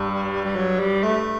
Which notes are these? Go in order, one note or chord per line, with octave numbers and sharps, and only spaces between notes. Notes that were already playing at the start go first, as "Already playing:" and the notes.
Already playing: G2 G3
G3
F#3
G3
A3